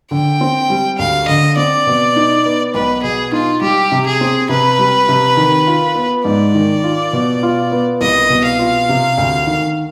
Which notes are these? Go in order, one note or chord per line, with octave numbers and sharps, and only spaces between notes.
D3 G5
C4
G3
D2 F5
D3 D#5
C4 D5
B2
D#4
B3
B1 B4
B2 G#4
D#4 F4
G3 G4
C3
G#4
C4
C3 B4
G3
C3
D#3
F4
B3
G#2 D5
D#3
F4
B2
F4
B3
C2 D#5
B2
F5
F4
C3
D2
D#3